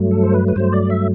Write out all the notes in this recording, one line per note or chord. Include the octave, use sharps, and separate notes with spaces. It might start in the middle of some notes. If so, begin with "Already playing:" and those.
Already playing: G2 F#3 A3
A4
C5
B4
B4
G2 F#3 A3 C5
D5
E5